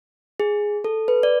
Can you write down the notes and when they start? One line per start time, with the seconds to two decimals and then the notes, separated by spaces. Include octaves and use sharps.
0.40 G#4
0.84 A4
1.08 B4
1.23 D5